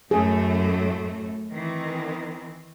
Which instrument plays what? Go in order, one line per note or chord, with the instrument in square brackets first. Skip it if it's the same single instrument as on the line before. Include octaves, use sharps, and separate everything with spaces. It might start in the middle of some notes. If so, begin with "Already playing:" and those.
[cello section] F#2 A2 A3 [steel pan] G#4
[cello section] D#3 E3 C4